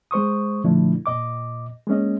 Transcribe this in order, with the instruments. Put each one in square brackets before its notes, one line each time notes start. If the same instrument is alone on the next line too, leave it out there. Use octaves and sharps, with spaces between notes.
[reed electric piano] G#3 C5 C#6 D#6
A#2 D3 F3 A3 D4 E4
A#2 D#5 D6
G#3 A#3 C#4 D#5